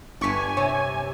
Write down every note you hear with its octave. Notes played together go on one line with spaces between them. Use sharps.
G1 G2 D5 G#5 C#6 B6
C3 C#5